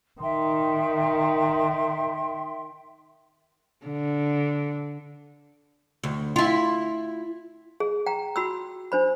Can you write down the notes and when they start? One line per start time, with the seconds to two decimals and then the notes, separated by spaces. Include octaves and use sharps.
0.21 D#3 E5 G5 C6
3.86 D3
6.03 D2
6.36 E4 F4
7.80 G#4
8.06 G5 A#5
8.36 F#4 B5 E6
8.92 D4 C5 B5